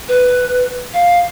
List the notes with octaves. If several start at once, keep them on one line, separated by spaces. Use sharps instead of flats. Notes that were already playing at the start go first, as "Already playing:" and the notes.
B4
F5